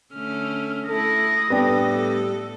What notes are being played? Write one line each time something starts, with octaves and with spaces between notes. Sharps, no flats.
D3 A3 C#4 F6
A3 E4 A4 D#6 A#6
A2 G3 A3 B3 D4 G4 A4